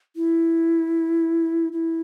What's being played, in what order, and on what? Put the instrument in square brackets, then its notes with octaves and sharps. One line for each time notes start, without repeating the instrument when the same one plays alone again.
[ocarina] E4
E4